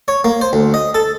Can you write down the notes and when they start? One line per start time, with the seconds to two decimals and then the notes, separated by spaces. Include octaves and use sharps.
0.08 C#5
0.24 A#3
0.41 C5
0.53 D2
0.74 D#5
0.94 A4